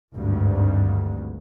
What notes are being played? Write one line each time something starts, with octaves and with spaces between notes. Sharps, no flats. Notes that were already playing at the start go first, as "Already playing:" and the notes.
G#1 D2 G2